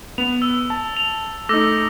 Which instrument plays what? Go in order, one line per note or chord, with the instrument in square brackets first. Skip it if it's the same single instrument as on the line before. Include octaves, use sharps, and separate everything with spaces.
[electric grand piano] B3 [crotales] F7
[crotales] E6
[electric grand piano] A5
[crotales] F7
[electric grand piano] A3 D#4 [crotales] D6 E6 A#6